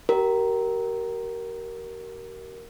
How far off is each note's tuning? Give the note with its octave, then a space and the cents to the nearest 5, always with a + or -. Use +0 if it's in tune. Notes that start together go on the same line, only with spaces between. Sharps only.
G4 -40 A#4 +0